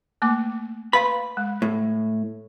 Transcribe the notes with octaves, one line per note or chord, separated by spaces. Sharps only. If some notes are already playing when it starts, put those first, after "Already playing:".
A3 A#3 D6
B4 F5 B5 C6
G#3
A2